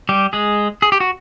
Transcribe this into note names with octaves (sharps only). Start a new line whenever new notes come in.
G3 G4
G#3 G#4
G#4
G4
F#4